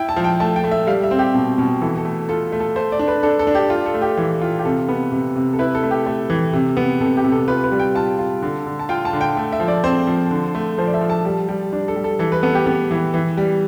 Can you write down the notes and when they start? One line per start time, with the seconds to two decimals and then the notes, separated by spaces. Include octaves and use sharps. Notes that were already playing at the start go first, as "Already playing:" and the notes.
Already playing: E4 G5
0.09 A5
0.16 F3
0.24 G5
0.40 A3 A5
0.56 G5
0.64 A3
0.71 E5
0.87 G3 F5
1.03 E5
1.11 C4
1.19 G4
1.34 B2
1.58 B2
1.81 E3 A4
1.98 A4
2.05 A3
2.29 F4 A4
2.52 A3
2.60 A4
2.76 A3 C5
2.92 D5
2.99 D4
3.08 B4
3.23 D4 A4
3.39 A4
3.47 D4
3.55 G4
3.70 F4
3.86 A4
3.94 A3
4.02 G4
4.17 E3
4.42 F4
4.59 G4
4.65 C3 A4
4.89 B3
5.12 C3
5.36 C3
5.53 A4
5.59 E4 B4
5.75 A4
5.83 A3
5.91 G4
6.06 A3
6.30 E3
6.53 C3
6.77 B3
7.00 C3 A4
7.17 G4
7.24 C3
7.32 A4
7.48 F4 B4
7.64 B4
7.72 G3
7.79 G5
7.95 F4 A5
8.19 F4
8.42 D3
8.66 D3
8.79 A5
8.89 F4 G5
9.05 A5
9.13 D3
9.21 G5
9.37 A3
9.52 E5
9.60 F3
9.68 D5
9.84 C4 C5
10.07 F3
10.31 D3
10.55 A3
10.78 F3 C5
10.87 D5
10.94 E5
11.01 F3
11.10 A5
11.25 G3
11.49 G3
11.73 D4
11.88 A4
11.96 G3
12.04 A4
12.19 E3 A4
12.32 B4
12.43 B3 A4
12.55 G4
12.66 B3
12.91 E3
13.14 E3
13.37 G3